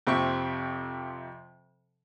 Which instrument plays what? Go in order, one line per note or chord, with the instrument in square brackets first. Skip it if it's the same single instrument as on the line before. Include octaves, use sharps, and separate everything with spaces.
[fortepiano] F2 C3 F3 E5 G5 C#6